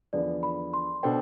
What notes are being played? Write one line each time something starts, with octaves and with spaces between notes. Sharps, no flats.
E2 D3 F3 B3 D5
B5
C6
B2 B3 D4 A4 C5 G5